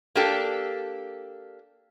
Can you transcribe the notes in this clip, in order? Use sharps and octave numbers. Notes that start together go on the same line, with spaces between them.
A#3 D4 G4 A4